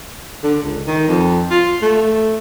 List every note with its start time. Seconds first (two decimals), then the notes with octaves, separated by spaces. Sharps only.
0.44 D3
0.63 C#2
0.87 D#3
1.08 F2
1.51 F4
1.82 A3